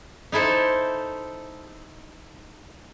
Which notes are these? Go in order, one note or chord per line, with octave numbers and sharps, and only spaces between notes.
D#4 E4 A4 C5